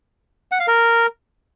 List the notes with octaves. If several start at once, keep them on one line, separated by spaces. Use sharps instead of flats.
F#5
F5
A#4